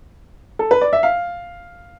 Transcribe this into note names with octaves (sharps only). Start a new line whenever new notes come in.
A4
B4
D5
E5
F5